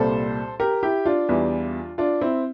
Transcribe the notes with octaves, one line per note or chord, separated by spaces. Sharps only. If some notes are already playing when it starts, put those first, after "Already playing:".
Already playing: C2 A#2 G3 A4 C5
G4 A#4
E4 G4
D4 F4
E2 E3 G3
D4 F4
C4 E4